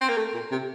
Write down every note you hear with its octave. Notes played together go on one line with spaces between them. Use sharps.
C4
A#3
A3
A#2
C3